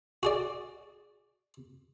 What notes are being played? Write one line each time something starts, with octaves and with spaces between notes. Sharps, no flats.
F#4 G#4 D5